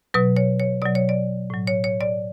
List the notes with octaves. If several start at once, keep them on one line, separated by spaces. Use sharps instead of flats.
B2 F#3 B4
C#5
C#5
B2 F#3 D5
C#5
D5
A2 F#3
C#5
C#5
D5